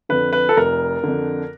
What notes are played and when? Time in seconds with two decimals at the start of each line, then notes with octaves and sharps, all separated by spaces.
0.09 F2 D3 B4
0.33 B4
0.49 A4
0.57 F1 A#4
1.03 F2 D3